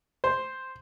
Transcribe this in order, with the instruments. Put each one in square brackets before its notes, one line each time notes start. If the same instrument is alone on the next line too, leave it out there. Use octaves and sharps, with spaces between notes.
[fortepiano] C5